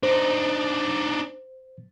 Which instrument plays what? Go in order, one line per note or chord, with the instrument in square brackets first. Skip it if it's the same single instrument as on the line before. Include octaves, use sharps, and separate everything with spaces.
[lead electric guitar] D4 D#4 [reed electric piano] C5